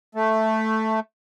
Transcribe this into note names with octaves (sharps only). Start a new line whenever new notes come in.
A3